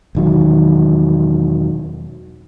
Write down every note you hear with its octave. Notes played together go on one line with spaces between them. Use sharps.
E1 D#3 F#3